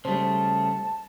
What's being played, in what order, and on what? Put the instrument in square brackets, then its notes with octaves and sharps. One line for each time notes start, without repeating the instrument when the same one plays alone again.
[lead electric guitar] C#3 A3 [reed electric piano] G3 C5 [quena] A5